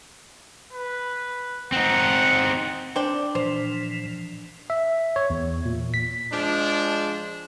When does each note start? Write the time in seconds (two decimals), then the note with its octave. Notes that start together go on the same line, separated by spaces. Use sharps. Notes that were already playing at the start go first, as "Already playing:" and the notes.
0.73 B4
1.72 C4 D#4 F#5
2.96 D4 C5 G5
3.35 A#2 E3 F3 C5
4.70 E5
5.16 C#5
5.30 E2
5.65 A#2
5.94 B6
6.32 F3 G#3 D4